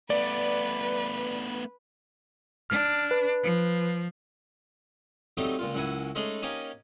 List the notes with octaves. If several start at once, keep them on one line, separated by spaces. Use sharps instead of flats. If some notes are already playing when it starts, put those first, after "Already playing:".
A3 B3 B4 D5
D4 F6
B4
F3
F#3 G3 A3 C4 D#4 G4
C#2 A#2 F4
C#2 F#2 E4 F#4 G#5
G#3 A3 C#4 D#4 G#4 A4
A#3 C#4 D#4 G4 C#5 G#5